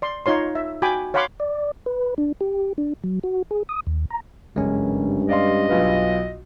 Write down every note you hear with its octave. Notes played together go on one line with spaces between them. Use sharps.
D5 C6
D#4 F4 C#5 C6
E5
F#4 G5 G#5 B5 D6
C#5 F5 F#5 B5 C6 D6
D5
B4
D4
G4
D4
F#3
F#4
G#4
D#6
D#2
A#5
F#1 G2 G#3 C#4
D5 D#5 F5 C6
B1 F4 B4